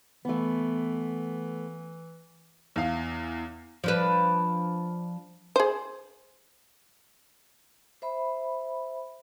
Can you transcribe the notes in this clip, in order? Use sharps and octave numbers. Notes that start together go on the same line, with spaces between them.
E3 A3 B3
E2 F5
F3 D4 B4
G#4 C5
C5 E5 B5